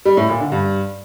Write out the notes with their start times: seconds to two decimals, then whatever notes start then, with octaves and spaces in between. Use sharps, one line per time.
0.05 G3
0.17 A2
0.29 A#2
0.40 D3
0.52 G2